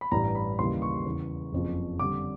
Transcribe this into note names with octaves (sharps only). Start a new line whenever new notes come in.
B5
A1 G2 E3 G3 A#5
B5
D#2 C#3 E3 G3 C6
C#6
E2 C#3 E3
F#1 F2 C#3 F3
F2 D3 G3 D6